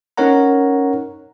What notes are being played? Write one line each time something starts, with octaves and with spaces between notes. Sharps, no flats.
C#4 D#4 A#4 C#5 F#5 A#5